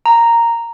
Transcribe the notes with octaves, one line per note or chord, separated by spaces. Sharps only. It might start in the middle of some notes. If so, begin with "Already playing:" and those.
A#5